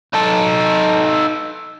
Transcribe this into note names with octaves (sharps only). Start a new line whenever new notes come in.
D#4 A4